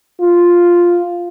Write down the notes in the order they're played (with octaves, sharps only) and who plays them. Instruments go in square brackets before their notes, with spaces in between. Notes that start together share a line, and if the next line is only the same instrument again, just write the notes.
[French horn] F4